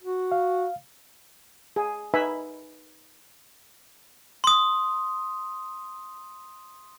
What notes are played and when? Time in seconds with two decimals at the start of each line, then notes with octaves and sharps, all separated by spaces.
0.01 F#4
0.32 F5
1.76 G#4
2.14 D#4 B4 E5 G#5 B5
4.44 C6 D#6